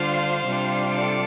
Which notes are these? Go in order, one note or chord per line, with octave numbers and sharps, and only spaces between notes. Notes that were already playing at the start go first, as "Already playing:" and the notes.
Already playing: D3 G3 D4 F4 C5 F5
C3 G3 D4 F4
A4 D5